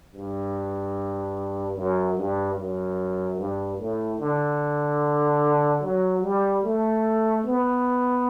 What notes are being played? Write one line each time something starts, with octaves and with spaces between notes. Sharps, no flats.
G2
F#2
G2
F#2
G2
A2
D3
F#3
G3
A3
B3